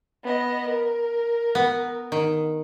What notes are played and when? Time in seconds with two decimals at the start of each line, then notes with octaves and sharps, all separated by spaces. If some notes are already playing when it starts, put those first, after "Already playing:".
0.24 B3 D#5
0.68 A#4
1.55 B3
2.12 D#3